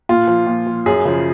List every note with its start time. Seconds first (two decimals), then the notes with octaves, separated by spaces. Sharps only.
0.09 A#2 F4
0.28 F3
0.47 A#2
0.67 F3
0.86 F#2 G#4
1.05 C#3 F3